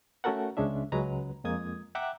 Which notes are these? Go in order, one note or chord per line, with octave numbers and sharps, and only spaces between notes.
A3 C#4 F#4 A4 A#4 F#5
C#2 G#3 C#4 D4 E5
C#2 F#3 G#3 B4 A#5
F2 G#3 A#3 D#6 G#6
E5 F#5 G5 A#5 D6 F#6